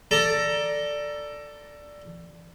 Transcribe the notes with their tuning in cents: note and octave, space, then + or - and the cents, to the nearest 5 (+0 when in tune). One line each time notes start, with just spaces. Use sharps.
A4 +15 D5 +0 A#5 +10